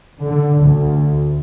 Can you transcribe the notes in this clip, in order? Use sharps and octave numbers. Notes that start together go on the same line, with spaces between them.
D3
D2